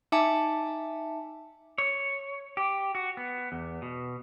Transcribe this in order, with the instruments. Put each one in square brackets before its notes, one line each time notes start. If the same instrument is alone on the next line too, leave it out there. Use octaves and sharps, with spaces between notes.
[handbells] D#4 E5 G#5 A5 D6 C#7
[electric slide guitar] C#5
G4
F#4
B3
E2
B2